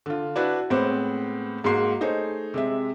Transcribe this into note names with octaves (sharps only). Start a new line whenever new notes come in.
D3 F4
D4 E4 F#4 B4
A2 G#3 B3 C4 C5 D6
G#2 G#3 A#3 F#4 C6 C7
A3 D#4 G#4 C5 C#5
C3 G#3 E5